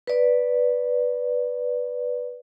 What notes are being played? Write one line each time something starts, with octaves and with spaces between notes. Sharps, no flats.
B4 D5